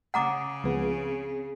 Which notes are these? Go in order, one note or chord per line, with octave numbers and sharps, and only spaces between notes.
C#3 F#5 A#5 D6 D#6
C#2 F3 B3 C4 G#4